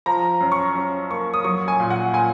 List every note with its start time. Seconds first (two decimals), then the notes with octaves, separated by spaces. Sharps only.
0.06 F3 A#5
0.41 F#2
0.52 C#6
0.75 F#2
1.11 A#3 C#6
1.34 D#6
1.44 F#3 C#6
1.68 G#5
1.80 A#2
1.90 F#5
2.13 A#2 G#5